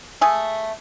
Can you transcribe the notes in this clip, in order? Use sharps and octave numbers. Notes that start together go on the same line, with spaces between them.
A3 G#4